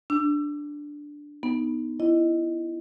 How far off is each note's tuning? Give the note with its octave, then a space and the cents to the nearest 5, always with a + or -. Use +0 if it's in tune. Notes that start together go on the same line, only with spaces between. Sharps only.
D4 +0 E6 +30
B3 +0 D#4 +0
E4 +25 D#5 +0